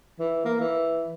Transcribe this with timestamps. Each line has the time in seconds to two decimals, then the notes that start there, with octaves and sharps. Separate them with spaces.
0.19 E3
0.45 A#3
0.60 E3